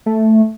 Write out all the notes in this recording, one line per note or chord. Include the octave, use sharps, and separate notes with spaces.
A3